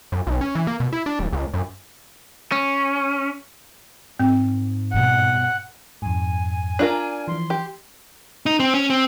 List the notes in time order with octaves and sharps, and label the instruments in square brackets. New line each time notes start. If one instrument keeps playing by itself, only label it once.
[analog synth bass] F#2
B1
C#4
E3
A#3
B2
E4
D4
D1
C#2
F#2
[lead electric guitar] C#4
[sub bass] G#2 [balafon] C4
[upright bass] G2 B2 [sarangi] F#5
[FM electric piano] F2 G#2 [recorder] G#5
[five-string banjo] D4 F4 A#4
[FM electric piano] E3 F3 [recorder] C6
[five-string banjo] G4
[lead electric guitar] D#4
C4
C#4
C4